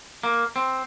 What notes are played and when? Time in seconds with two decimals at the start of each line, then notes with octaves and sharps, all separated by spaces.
0.23 A#3
0.56 C4